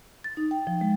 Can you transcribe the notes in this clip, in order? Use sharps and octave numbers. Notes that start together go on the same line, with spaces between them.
A6
D#4
G5
F3
G#3